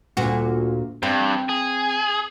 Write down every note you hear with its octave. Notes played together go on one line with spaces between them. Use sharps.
D2 A#2 F#4
G2 C4
G#4